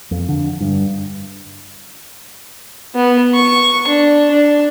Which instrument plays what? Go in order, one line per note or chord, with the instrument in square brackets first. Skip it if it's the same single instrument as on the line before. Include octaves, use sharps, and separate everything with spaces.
[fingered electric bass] F2
D3
G2
[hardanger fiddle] B3
C#6
D4
D4